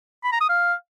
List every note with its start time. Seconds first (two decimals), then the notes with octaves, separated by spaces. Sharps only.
0.24 B5
0.33 A#5
0.41 D#6
0.49 F5